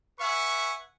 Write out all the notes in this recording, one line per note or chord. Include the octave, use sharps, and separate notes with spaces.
B4 E5 F#5 G#5 C#6